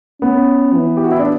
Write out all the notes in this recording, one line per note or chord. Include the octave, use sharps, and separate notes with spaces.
B3 C#4
E3
G4
F#4
E4
D4